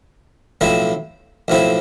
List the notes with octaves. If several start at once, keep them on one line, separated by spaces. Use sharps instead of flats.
B1 A2 F3 C4 E4
B1 A2 F3 C4 E4